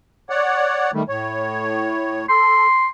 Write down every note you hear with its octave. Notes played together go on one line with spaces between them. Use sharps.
C#5 D5 F#5
D#3 G3 A3
A2 C#5
A4 C6